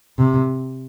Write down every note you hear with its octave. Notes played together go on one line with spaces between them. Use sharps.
C3